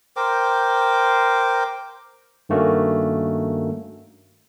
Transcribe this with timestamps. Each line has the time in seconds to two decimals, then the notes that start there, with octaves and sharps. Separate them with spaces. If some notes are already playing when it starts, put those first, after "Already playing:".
0.17 A#4 C5 G5 D6
2.49 G2 D#3 A3 A#3 C#4 F#4